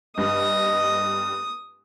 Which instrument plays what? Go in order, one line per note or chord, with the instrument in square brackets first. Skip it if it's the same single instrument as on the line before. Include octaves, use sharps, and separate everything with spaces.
[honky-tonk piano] G2 [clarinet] D#5 [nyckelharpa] D#6